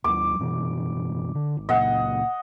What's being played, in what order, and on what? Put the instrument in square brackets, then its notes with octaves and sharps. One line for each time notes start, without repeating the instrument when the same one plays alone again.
[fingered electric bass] D#2 F#3 [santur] D6
[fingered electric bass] F#1 B2 E3
D3
G#1
[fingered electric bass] C#2 A#2 [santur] D#5 F#5